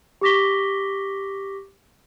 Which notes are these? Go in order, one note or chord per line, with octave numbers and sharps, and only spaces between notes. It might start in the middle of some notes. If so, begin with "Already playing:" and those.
G4 C#6 D6 A#6 B6 G7